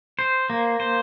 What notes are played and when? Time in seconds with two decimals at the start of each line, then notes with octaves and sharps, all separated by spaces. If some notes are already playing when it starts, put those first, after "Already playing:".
0.19 C5
0.50 A#3
0.80 C5